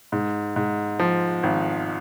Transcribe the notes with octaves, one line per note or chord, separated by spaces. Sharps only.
G#2
G#2
F3
G#1